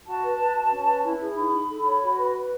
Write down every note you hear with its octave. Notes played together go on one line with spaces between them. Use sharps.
F#4 A5
B4
B4
F#4
C#4
B4
E4
G#4
D#4 B5
D#4
A4
C#5
F#4
B4
B4